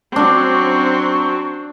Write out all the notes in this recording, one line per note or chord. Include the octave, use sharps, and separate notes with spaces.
F#3 C4 D4 C#6